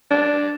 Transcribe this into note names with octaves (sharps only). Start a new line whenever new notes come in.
D4